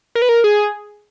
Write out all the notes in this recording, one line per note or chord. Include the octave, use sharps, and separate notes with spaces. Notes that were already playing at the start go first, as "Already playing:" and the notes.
A#4
B4
A#4
G#4